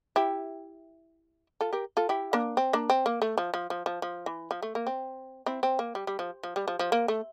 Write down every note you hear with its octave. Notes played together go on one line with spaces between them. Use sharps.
E4 G4
F4 A4
G4 A#4
F4 A4
E4 G4
A#3 D4
C4
A#3 D4
C4
A#3
A3
F3
F3
F3
F3
F3
E3
F3
A3
A#3
C4
C4 E4
C4
A#3
G3
G3
F3
F3
G3
F3
F3
A#3
A3